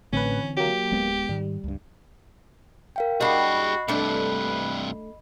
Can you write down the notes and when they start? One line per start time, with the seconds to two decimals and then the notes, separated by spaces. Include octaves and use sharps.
0.13 A1 D3 E3 C4 C#4 B4
0.57 F#3 A#3 G4
0.92 D1 G#3 B3
1.29 G#2 D#3 G3
1.64 C#2 G2
2.96 A#4 F5 G5
3.21 G3 D4 F#4 G#4 D#5 F#5 B5 C7
3.88 G2 C3 A3 D4 B4